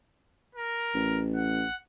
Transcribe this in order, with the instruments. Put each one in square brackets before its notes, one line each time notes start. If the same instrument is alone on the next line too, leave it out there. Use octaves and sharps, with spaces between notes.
[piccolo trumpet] A#4
[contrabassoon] A1
[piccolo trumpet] F#5